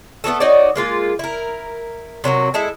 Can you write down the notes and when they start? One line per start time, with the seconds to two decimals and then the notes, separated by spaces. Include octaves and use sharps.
0.24 A3 B3 F#4 A4
0.40 D#4 F#4 C#5 D5
0.76 G#3 A#3 F4
1.19 E4 A#4
2.24 C3 F#3 A#3 F#4
2.54 G#3 E4 A4